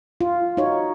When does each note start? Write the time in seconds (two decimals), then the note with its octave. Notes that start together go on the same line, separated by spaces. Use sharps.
0.21 F4
0.57 D#4 F#4 C#5